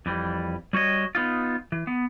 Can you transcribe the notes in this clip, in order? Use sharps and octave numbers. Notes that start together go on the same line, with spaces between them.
F2 E3 G3
G3 F#4 C#5 D#5
B3 D#4 F4
E3
B3